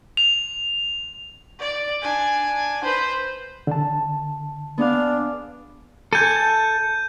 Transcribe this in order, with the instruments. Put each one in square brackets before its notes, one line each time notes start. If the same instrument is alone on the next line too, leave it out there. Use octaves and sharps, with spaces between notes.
[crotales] F7
[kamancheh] D5
D4 G#5
B4 C5
[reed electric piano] D3 A5
[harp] B3 G#4 F5 [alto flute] D4
[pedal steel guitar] A4 G#5 [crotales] G6 D#7